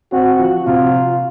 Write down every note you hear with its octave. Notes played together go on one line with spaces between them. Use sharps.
C4 F#4
F3
C3 F4